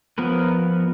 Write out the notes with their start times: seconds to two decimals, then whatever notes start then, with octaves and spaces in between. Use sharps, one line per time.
0.18 F3 B3 A#4 B4